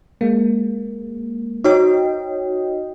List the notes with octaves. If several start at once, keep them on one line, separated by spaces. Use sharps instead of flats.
G#3 A#3
D#4 F#4 C#5 D#5 G5